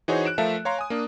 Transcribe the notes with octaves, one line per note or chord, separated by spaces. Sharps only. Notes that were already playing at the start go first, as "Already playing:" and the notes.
E3 D#4 F#4 G#4 C5 C#5
F#6 D7 E7
F3 A3 A4 A#4 E5 F5
C#5 F5 A#5 C6
G#5 D#6
A#3 D4